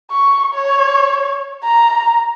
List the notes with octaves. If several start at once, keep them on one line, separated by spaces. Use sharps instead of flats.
C#6
C#5
A#5